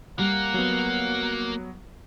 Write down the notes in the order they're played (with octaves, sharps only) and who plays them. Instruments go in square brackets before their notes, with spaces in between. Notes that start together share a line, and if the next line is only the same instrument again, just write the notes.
[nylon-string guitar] G3 [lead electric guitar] A#3 A#4 [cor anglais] F#5
[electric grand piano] F#3 B3